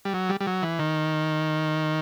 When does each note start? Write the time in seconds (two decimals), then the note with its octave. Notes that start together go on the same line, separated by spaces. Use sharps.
0.05 G3
0.14 F#3
0.29 G3
0.41 G3
0.47 F#3
0.62 E3
0.79 D#3